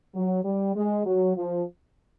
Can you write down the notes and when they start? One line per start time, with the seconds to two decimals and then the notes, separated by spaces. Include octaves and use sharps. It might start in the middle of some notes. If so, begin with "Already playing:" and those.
0.15 F#3
0.45 G3
0.76 G#3
1.06 F#3
1.36 F3